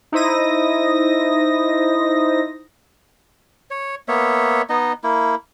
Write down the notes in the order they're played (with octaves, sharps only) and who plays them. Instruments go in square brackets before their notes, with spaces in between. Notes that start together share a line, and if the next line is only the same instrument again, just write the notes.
[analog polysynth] D#4 E4 C5 D#6 A#6
[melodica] C#5
A#3 B3 C#5 E5
B3 D#4 D#5
A#3 E4